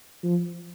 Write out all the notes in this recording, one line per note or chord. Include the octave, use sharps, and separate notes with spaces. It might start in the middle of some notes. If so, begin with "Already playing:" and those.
F3